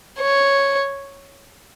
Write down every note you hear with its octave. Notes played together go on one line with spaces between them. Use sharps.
C#5